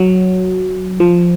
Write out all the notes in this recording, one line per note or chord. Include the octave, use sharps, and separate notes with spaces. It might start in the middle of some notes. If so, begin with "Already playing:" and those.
Already playing: F#3
F3